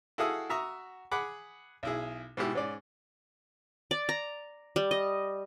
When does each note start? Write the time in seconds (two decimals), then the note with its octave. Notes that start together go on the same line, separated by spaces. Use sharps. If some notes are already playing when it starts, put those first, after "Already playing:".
0.18 E4 F#4 G#4 A4 F5 D#6
0.49 F#4 E5 A#5 C#6 D#6
1.12 G#4 F#5 B5 D6
1.83 B1 E4 G#4
2.37 G#2 B2 E4 G4
2.55 G#2 C#4 D5
3.91 D5
4.09 A#5
4.76 G3
4.91 D#5